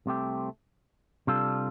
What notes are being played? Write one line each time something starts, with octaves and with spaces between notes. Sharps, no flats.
C2 C3 A3 C4 G4
C3 G3 D4 F4 A4